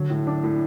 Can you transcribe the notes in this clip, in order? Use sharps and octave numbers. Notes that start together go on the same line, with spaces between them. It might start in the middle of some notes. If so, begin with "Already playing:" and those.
Already playing: D3 F#3
A2
D4
A2